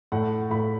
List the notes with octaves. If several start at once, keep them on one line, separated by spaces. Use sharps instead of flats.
A2 F#5
A2 B5